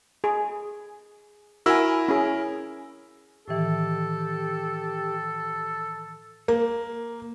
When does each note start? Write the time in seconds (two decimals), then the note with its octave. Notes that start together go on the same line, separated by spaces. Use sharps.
0.24 G#4
1.66 E4 F#4 A#4 G#5 E6
2.08 C#4 G#4
3.48 A2 D#3 E3 G4 A4
6.48 A#3